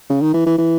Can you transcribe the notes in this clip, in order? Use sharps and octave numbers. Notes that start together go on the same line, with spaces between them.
C#3
D#3
E3
E3
E3